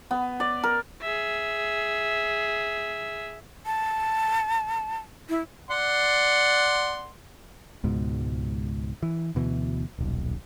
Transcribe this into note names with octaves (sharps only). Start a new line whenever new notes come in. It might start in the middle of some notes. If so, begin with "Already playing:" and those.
B3
D5
A#4
G#4 E5
A5
E4
D5 F#5 C6
C#2 G#2 B2
E3
D2 B2 D3 E3
D#1 B1